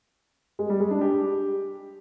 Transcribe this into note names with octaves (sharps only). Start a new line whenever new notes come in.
G#3
G3
G#3
D4
G4